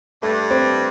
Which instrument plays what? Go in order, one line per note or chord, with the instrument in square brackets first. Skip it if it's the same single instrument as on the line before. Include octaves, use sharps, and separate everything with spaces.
[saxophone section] G2 [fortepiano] A3
[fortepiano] C4